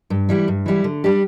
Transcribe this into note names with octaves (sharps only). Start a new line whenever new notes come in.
G2
E3 G3 E4
G2
E3 G3 E4
D3
G3 D4 G4